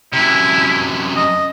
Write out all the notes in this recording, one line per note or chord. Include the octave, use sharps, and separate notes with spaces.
F#2 C3 E4
D#5